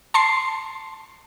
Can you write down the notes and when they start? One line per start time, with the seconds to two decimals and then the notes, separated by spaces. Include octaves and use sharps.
0.14 A5 C6 C7